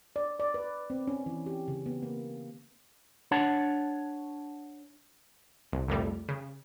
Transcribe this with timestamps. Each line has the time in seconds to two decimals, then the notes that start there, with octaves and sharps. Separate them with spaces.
0.16 D5
0.40 D5
0.54 B4
0.90 C4
1.07 C#4
1.26 E3
1.46 G4
1.68 C#3
1.86 B3
2.02 A#3
3.31 D4 C#5 F#5 A5
5.72 C2
5.88 C2 F2 A#2 G3 A3
6.28 C#3